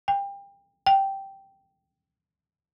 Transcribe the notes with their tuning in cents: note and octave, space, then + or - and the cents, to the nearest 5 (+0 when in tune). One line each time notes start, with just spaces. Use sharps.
G5 +30
G5 -10